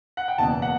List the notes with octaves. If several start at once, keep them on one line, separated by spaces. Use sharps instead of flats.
F#5
G5
F#1 E2 B2 A5
F#5